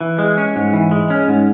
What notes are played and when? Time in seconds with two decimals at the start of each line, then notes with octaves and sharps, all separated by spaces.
0.01 E3
0.18 G#3
0.38 C#4
0.56 G#2
0.73 E3
0.91 G#3
1.10 C#4
1.28 G#2